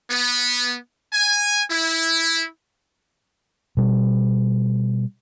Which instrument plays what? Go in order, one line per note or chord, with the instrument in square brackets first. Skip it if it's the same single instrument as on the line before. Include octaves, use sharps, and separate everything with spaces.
[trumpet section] B3
G#5
E4
[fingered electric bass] B2 G3